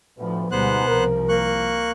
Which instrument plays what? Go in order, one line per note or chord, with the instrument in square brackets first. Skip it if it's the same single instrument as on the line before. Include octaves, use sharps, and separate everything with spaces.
[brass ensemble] D2 B3 [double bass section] A2 F3
[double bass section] D2 B2 G3 [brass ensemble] G#2 [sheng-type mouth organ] B3 C5 F#6
[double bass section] C2 F3 [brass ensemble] A#4
[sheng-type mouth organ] A#3 C#6 F#6